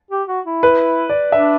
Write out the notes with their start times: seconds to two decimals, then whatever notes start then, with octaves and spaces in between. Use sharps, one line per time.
0.11 G4
0.28 F#4
0.46 E4
0.63 B4
1.09 D5
1.32 D4 E5